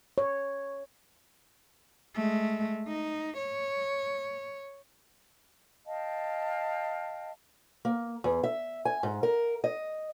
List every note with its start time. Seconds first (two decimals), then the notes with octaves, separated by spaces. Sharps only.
0.18 C#5
2.15 G#3 A3
2.88 D#4
3.37 C#5
5.85 D#5 F5 G5 A5
7.85 A#3
8.24 E2
8.43 E5
8.85 G#5
9.03 G#2
9.23 A#4
9.64 D#5